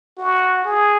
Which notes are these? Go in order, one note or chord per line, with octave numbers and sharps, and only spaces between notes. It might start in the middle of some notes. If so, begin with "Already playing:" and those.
F#4
G#4